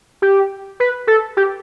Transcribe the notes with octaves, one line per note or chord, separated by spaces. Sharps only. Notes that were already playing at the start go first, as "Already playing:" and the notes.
G4
B4
A4
G4